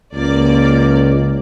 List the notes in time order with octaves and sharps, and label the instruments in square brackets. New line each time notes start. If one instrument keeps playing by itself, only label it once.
[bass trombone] C#2 [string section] A#3 D5